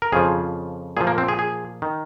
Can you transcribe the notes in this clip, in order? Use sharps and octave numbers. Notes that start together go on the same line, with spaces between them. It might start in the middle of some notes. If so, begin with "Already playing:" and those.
A#4
F2 C#3 F3 G#4
A#2 F3 G#4
A#3
C4
G#4
G#4
D#3